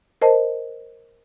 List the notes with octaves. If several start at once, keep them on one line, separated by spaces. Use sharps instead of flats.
A#4 C5 D#5 A5